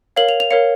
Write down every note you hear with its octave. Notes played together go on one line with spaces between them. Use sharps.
A#4 C#5 F5 F#7
F7
F7
A#4 C#5 F5 C#7